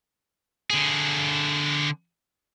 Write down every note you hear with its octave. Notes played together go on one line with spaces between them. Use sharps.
D3 G#4